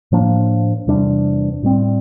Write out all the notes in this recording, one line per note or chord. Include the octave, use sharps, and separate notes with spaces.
A2 F3 A#3 D4
E2 C3 G3 D4
A2 G3 C4